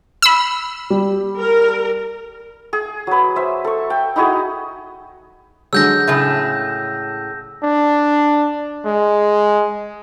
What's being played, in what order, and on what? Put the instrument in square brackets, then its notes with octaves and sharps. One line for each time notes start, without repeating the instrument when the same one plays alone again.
[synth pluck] B5 E6
[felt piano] G3
[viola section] A#4
[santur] G#4
F#3 B4
C5 E5
A4 C#6
G5
D#4 E4 F#4 G#4
[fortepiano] D3 F#3 G#3 [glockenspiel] E6 G6 A#6
[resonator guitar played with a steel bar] A2 C#3 A3
[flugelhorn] D4
G#3